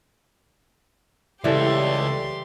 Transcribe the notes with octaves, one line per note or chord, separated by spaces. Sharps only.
C#2 E3 G3 G4 A4 D5 C6